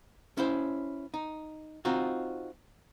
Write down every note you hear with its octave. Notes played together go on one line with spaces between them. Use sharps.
C#4 E4 C5
D#4
C4 D#4 F4 F#4